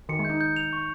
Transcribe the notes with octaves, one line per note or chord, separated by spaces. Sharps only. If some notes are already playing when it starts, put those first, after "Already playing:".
D#3 C#7
G#3
G6
D#4
G6
F7
C#6